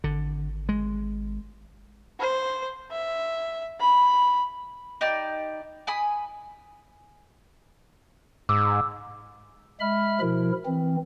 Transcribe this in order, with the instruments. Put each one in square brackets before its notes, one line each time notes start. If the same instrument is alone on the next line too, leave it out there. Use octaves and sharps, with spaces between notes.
[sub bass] G#1 [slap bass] D3
[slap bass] G#3
[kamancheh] C5
E5
B5
[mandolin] D#4 G4 D5
G#5 B5 D#6
[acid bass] G#2 [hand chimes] D6 E6
[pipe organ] G#3 E5 B5 F6
B2 F3 E4 A#4
E3 C4